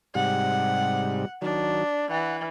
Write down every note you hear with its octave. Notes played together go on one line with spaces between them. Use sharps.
G#2 C3 G3 F#5
D#3 F#3 D4
E3 F#5